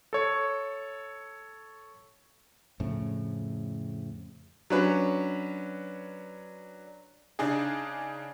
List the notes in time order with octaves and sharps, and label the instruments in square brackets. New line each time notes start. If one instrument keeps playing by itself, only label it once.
[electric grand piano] A4 C#5
[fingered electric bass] F2 A2 C#3
[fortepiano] F#3 C#4 D4 B4
[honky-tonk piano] C#3 D4 D#4 G#4